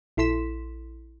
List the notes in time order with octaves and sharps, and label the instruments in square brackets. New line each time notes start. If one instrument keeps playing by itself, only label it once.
[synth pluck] A#1 E4 A4 C6 B6 E7